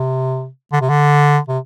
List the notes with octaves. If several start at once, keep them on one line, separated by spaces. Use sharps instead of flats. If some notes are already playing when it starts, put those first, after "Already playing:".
Already playing: C3
D3
C3
D3
C3